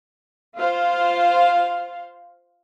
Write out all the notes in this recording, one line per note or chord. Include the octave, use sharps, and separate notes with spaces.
F4 C5 F5